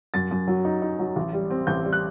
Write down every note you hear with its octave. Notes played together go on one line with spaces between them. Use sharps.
F#2 A6
F#2
F#3
D#4
D#4
F#3
A1
G3
C4
A1 G6
G3
F#6